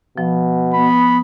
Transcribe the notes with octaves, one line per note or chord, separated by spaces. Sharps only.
B2 F3
B3 B5